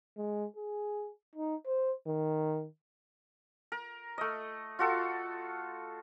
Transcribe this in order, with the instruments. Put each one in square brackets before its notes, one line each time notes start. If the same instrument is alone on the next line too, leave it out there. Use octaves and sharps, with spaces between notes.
[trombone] G#3
G#4
D#4
C5
D#3
[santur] A#4
A3 D#5
F4 F#4 A4